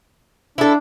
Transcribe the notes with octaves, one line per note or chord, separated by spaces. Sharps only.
D4 E4 A4